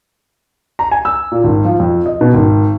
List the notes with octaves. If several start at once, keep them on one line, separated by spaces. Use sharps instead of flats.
A#5
G#5
E6
A#2
G#1
F3
F2
D#5
B2
G#1